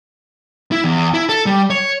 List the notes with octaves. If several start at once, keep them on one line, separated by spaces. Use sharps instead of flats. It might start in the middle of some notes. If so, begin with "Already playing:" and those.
E4
E2
E4
A4
G3
C#5